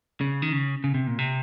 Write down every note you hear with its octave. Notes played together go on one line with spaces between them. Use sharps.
C#3
D#3
C#3
C#3
C3
A#2
C3